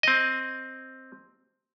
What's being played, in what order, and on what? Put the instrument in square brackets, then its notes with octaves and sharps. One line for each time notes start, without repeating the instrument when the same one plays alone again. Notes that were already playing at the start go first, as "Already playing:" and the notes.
[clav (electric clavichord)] C4 D#5